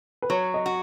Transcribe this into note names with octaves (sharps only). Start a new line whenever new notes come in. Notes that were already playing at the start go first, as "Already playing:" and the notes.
B4
F#3 C#5
D#5
F#4